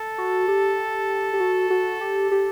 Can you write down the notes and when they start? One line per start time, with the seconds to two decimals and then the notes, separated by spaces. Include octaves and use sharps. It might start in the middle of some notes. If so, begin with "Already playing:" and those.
Already playing: A4
0.18 F#4
0.48 G4
1.33 G4
1.40 F#4
1.70 F#4
2.01 G4
2.31 G4